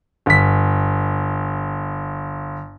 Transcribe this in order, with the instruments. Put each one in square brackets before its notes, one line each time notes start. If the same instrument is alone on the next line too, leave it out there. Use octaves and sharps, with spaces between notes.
[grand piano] G1 B6